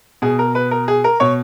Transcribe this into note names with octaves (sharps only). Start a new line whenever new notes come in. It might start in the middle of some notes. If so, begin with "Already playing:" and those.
B2 G#4
A#4
B4
A#4
G#4
A#4
B2 C#5